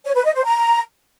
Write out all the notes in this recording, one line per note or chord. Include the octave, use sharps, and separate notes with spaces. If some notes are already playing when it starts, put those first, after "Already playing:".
C#5
B4
D#5
C5
A#5